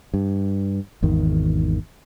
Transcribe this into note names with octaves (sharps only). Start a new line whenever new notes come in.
G2
G#1 E2 D#3